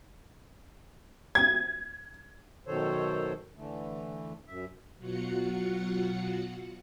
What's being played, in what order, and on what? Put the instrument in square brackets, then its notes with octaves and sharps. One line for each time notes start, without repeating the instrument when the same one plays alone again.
[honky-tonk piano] G#6
[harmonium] F#2 B2 D#3 A4 C5 C#5
D3 E3 A3
F#2 E5
[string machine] B2 F#3 F4 F#4 F#5 C#7